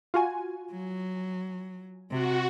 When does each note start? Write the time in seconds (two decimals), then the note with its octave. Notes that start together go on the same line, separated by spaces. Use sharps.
0.14 F4 F#4 G#5
0.71 F#3
2.11 C3 F#4